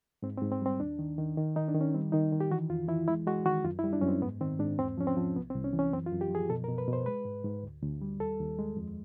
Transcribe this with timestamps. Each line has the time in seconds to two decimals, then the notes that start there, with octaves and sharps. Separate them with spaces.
0.23 G#2 C4
0.37 C4
0.42 G#2
0.51 C4
0.62 G3 C4
0.80 D#2 D4
0.99 D#3
1.18 D#3
1.37 D#3
1.56 D#3 D#4
1.69 D4
1.74 D#3
1.81 C#4
1.94 G3 C4
2.12 D#3 D#4
2.33 D#3
2.40 G4
2.51 E3 F#4
2.69 F2 F4
2.88 E3 E4
3.08 G#3 E4
3.27 G#3 F#4
3.45 D#3 F#4
3.64 F#2 F4
3.79 E4
3.84 G3
3.93 D4
4.02 F#2 C#4
4.08 C4
4.22 G#2 B3
4.41 D#3 C4
4.59 G#2 D4
4.79 E2 C4
4.98 F3 C#4
5.07 C4
5.17 F3
5.35 C2 B3
5.50 C4
5.54 C2
5.64 C#4
5.73 E3
5.79 C#4
5.92 F#2 C4
6.06 F4
6.12 F#2
6.21 G4
6.30 F3 G#4
6.50 B2 A4
6.64 A#4
6.68 B2
6.78 B4
6.88 B2
6.93 C5
7.06 G#3 B4
7.25 G#2
7.45 G#2
7.63 D2
7.82 D2
8.01 G3
8.20 D#2 A4
8.39 D#2
8.59 G#3
8.77 F2